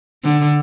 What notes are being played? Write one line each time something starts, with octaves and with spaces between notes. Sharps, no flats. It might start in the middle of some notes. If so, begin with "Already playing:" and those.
D3